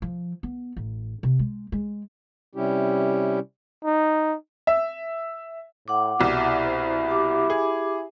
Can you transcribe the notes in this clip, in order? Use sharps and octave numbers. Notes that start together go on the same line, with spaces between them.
F3
B3
A1
C3
G#3
G#3
C3 G3 C#4 E4 G4
D#4
E5
A2 F#5 D6
C2 B2 E4
C5
G4 D6
G#4